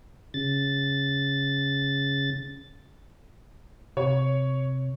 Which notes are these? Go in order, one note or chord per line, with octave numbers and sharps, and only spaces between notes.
C#3 A6
C3 C#5